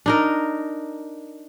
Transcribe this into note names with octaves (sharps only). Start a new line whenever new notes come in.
D4 D#4 A#4